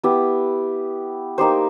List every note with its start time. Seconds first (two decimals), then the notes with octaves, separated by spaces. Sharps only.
0.03 B3 E4 G4
1.38 A#3 D#4 G4 C5